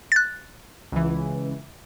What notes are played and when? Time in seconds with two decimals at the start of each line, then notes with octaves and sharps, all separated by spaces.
0.12 F#6 A6
0.92 C#2 E3